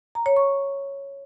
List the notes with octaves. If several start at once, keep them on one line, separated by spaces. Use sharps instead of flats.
A#5
C#5
C#6